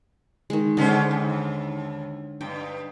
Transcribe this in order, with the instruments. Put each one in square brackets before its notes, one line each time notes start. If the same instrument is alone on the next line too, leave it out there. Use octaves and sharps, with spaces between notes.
[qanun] D#3 G#3
[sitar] G#2 C#4 C5 [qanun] D3 G#3 D4
[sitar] D#2
[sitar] G2 [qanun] G5